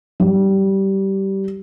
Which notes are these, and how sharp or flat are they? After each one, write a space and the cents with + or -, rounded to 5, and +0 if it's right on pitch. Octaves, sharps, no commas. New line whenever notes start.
G3 -15